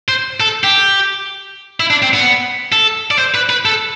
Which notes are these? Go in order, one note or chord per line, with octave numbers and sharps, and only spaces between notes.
C5
A4
G4
E4
D4
C4
B3
A4
D5
C5
B4
B4
A4